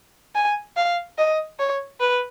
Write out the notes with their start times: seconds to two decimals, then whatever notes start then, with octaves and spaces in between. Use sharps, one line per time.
0.35 G#5
0.76 F5
1.18 D#5
1.59 C#5
2.00 B4